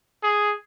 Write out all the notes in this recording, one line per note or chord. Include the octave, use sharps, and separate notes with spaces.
G#4